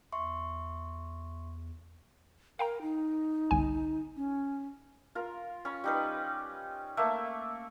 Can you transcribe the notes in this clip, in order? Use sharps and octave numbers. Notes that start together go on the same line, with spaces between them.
E2 E5 C6 C#6
A#4 F5 G5 A#5
D#4
G1 C2 G#5
C#4
F4 A#4
C#4 B5
G3 D#4 B4
A3 A#3 E5